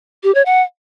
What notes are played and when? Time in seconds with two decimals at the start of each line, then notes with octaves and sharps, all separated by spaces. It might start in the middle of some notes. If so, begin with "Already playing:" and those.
0.23 G4
0.35 C#5
0.46 F#5